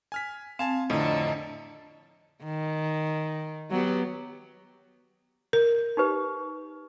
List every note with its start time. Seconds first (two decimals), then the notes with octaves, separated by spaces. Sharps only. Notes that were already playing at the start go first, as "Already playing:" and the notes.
0.12 G#5 F6 B6
0.59 C4 F5 G#5 A5
0.90 F2 A2 D3 A4 D#5 A#5
2.44 D#3
3.71 F#3 B3 G4
5.53 A#4
5.97 D#4 G4 B4